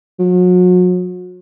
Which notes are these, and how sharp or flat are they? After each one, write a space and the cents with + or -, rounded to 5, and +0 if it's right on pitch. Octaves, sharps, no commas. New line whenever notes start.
F#3 -35